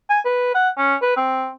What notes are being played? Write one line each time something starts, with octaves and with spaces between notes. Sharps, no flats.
G#5
B4
F#5
C#4
B4
C4